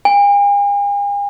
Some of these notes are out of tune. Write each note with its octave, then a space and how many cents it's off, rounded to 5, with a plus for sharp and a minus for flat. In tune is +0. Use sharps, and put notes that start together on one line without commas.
G#5 -45